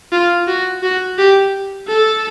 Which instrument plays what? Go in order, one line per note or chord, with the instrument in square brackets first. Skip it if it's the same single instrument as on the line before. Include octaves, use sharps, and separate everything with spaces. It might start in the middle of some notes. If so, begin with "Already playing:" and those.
[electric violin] F4
F#4
F#4
G4
A4